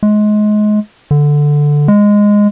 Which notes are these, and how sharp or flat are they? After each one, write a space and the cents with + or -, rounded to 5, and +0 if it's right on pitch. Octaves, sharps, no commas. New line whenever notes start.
G#3 +25
D3 +0
G#3 -10